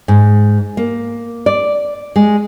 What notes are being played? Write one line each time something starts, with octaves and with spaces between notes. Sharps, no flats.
G#2
A#3
D5
G#3